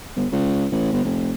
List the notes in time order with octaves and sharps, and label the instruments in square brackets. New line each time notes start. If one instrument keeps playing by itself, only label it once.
[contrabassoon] G1
C#2
A1
G1
F1